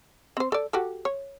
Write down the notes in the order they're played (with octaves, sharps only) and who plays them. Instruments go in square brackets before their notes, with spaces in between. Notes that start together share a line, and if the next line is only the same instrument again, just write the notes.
[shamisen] C4 C5
A4 D5
F#4 G4 A4
C#5